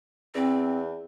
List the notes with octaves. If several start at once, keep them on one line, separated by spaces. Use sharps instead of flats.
E2 C4